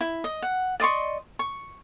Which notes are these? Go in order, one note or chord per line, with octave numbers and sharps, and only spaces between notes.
E4
D#5
F#5
D5 D#5 C6 C#6
C#6